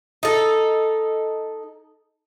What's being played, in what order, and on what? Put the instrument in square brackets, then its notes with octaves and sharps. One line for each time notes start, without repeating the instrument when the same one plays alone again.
[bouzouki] D#4 A4